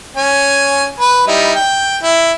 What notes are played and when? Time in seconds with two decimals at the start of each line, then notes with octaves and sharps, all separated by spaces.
0.16 C#4 G#5
1.00 B4
1.27 G3 D#4 E4
1.55 G5
2.03 E4